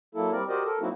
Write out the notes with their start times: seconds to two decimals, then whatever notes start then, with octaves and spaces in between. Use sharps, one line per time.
0.15 F#3 A#3 E4 A4
0.32 G3 C4 A#4 D5
0.49 F#4 G4 A#4 C5 D5 D#5
0.64 A4 A#4
0.80 F#3 A#3 C4 D#4 E4 F#4